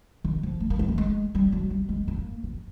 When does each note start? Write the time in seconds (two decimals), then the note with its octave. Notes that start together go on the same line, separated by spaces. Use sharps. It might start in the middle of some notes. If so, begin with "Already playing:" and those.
0.24 D#3
0.43 F3
0.60 A3
0.70 A#3
0.79 G#3
0.88 A3
0.98 G#3
1.35 G3
1.52 F#3
1.70 G3
1.89 G#3
2.08 A#3
2.43 B3